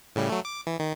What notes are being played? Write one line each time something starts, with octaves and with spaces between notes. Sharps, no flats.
A2 C#3 G3
F#3 A3
D6
E3
D#3